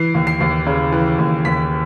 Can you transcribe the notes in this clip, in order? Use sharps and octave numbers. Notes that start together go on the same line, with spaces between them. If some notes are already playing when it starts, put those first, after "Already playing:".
Already playing: E3 C7
D#2
C7
D#2
C#3
E3
D#2
D#2 B6